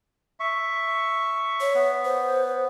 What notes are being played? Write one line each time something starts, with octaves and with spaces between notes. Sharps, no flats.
E5 C#6
C#5
B3
C5